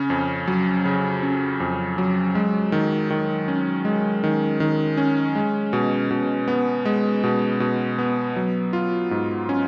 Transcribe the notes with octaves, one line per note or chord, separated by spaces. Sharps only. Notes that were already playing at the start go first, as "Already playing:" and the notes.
Already playing: C#3 C#4
F2
F#3
C#3
C#4
F2
F#3
G#3
D#3
D#3
C#4
G#3
D#3
D#3
C#4
G#3
B2
B2
B3
G#3
B2
B2
B3
F#3
F4
G#2
C#4